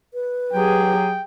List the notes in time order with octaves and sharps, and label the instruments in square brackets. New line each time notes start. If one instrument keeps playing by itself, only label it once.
[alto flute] B4
[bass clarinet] F#3 [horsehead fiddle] G4 G#4 [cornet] G5